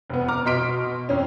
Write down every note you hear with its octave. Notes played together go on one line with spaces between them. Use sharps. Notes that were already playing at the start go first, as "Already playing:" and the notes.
F1 B3
A#5 D6 F6
B2 D#5 C6 B6 D7
F2 C#4